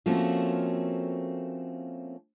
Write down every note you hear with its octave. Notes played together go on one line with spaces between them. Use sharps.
F3 A3 A#3 C4 C#4 F#4